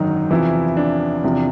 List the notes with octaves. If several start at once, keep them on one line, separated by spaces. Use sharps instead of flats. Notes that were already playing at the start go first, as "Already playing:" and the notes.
Already playing: G#1 F#2 D3 D#3 F#3 D#4
E2 C3 E3 F3 E4
D4
E2 C3 F3